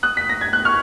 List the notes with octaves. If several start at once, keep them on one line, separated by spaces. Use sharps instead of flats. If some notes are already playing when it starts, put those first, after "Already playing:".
D#6 F#6
B6
A#6
G#6
F#6
C#6 F6